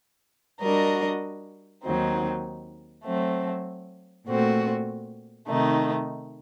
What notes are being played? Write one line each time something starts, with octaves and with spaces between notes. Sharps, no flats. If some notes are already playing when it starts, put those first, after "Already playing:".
G3 D4 F#4 A#4 D#5
D#2 D#3 F#3 C4 D#4
F#3 A3 C4
A#2 A3 C4 F#4
C3 D#3 A3 D#4